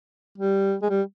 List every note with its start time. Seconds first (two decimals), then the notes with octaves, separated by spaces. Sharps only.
0.38 G3
0.82 G#3
0.90 G3